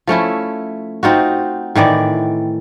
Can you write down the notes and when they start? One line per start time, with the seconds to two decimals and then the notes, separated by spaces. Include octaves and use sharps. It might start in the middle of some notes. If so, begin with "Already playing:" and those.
0.07 F3 A3 C#4 E4
1.03 C4 D#4 F4 F#4
1.75 A2 D#3 E3 D5